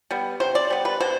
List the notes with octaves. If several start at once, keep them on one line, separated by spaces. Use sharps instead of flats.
G3 B3
C3 C5
D5
G3 B3
B4
B2 C5